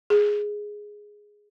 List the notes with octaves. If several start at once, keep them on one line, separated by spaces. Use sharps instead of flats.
G#4